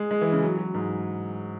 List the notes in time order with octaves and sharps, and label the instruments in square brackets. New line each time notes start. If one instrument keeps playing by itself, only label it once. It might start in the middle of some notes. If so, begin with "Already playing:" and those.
Already playing: [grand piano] G#3
G#3
E3
C#3
F#3
F#3
G#2